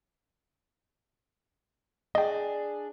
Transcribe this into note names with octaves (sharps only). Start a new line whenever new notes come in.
D4 G#4 D#5 G5